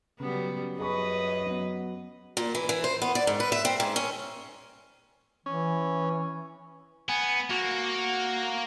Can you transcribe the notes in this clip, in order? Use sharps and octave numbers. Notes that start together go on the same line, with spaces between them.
C#3 F#3 G3 B3
F#2 G#4 B4 D#5 B5 C#6
F#3 B3
A#2
E3
E3
C5
B3
D5
G#2
B4
E5
C4
G#2
C#4
E3 C#4
B3 G#5
A#3 F#4